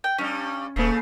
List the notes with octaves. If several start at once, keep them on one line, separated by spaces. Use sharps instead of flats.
G5
G2 G3 C#4
D#1 C#3 A3 A#3 B6 C7